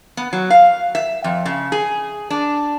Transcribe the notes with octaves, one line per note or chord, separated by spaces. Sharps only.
B3
F#3
F5
E5
F2
C#3
G#4
D4